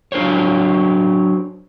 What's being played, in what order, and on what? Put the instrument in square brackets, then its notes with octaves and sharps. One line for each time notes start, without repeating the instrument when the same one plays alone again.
[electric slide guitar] F#3 D4 A#4 C5 C#5